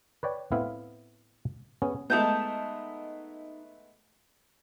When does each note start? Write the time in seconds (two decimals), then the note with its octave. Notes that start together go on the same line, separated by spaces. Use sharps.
0.23 B4 C#5 D5 G5
0.52 A2 B3 C4 E4 E5 F5
1.82 B3 C#4 G#4
2.10 G#3 A3 B3 D#4 A5 G6